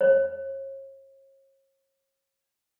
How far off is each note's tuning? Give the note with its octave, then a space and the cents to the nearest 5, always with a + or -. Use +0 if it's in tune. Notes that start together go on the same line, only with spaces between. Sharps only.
C#5 -40